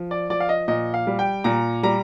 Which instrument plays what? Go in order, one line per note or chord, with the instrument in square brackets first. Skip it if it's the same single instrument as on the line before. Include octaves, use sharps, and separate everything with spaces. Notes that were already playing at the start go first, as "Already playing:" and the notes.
Already playing: [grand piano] F3
D5
F3 D5
F5
D#5
A#2 D#5
F5
G3
G5
A#2 A#5
G3 A#5